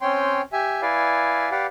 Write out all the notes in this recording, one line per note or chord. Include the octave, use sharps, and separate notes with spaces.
C4 C#4 C#5 G5 C6
G4 E5 G#5
E4 B4 D5 F5 G#5
G4 B4 D5 F5 F#5